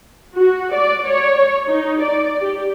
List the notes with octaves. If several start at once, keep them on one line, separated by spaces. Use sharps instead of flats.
F#4
D5
C#5
D#4
D5
G4